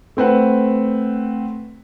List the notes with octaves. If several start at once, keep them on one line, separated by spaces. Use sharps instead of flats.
A3 C4 B4 F#5